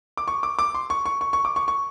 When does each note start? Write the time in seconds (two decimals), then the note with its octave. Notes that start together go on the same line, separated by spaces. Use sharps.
0.17 D6
0.28 C#6
0.43 D6
0.59 D6
0.74 C6
0.90 C#6
1.06 C#6
1.21 C#6
1.33 C#6
1.45 D6
1.56 C#6
1.68 C#6